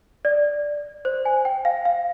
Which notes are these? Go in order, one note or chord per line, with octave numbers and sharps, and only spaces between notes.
D5
C5
G#5
G5
F5
F5